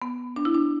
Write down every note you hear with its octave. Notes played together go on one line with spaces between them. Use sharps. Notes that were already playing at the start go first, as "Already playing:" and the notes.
B3
D4
E4
D4